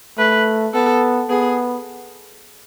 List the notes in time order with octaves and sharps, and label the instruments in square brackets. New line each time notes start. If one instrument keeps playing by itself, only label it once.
[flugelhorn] A3 [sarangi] B4
[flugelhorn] B3 [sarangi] A4
[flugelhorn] B3 [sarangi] G#4